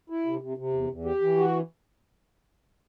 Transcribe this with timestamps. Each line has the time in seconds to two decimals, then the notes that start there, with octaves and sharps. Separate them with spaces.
0.10 E4
0.26 C3
0.41 C3
0.57 C3
0.73 E2
0.90 E2
1.05 G4
1.21 E3
1.37 F#4